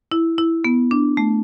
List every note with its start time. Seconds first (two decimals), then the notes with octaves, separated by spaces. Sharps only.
0.12 E4
0.38 E4
0.65 B3
0.91 D4
1.17 A3